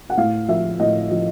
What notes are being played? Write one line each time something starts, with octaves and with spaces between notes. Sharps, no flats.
F#5
A2 F5
F3 E5
A2 D#5
F3